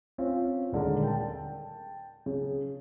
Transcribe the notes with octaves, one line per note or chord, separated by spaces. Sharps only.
C4 C#4 F4
D#1 D3 G#3 A#4
G5 A5
C#3